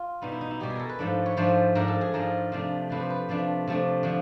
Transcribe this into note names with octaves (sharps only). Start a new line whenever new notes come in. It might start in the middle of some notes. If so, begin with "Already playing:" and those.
Already playing: F4
B2 G3 B3 D#4
E4
D#4
E4
B2 G3 B3 G4
G#4
A4 A#4
B4
G#2 F3 A3 D4
C#5
G#2 F3 A3 D4 C5
G#2 F3 A3 D4 A#4
A4
G#4
G#2 F3 A3 D4 A#4
C3 F3 A3 D4
C3 F3 A3 D4 B4
C5
B4
C3 F3 A3 D4
C3 F3 A3 D4
D3 F3